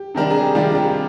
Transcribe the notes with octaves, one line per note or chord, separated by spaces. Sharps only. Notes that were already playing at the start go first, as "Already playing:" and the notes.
Already playing: G4
C3 D#3 G3 D4 A#4
G#4
G4
C3 D#3 G3 D4 F4
G4